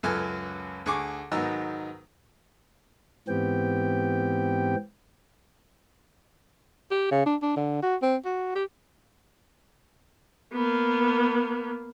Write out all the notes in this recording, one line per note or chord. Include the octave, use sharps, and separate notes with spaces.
C#2 F#2 A4 B4 G#5 F6
D2 G#4 C#6 D6
G#2 D#3 F#3 B3 D#4 E6
G#2 E3 B3 C4 G4 G5
G4
C#3
D4
D4
D3
F#4
C4
F#4
G4
A#3 B3